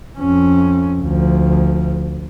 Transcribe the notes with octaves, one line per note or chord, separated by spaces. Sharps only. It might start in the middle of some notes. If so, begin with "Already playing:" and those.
F2 C#4
D2 F3